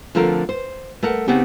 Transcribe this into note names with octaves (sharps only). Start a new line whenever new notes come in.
D3 F3 A3 C4 A#4
C5
A3 A#4 F#5
C#3 B3 C4 D#4 G4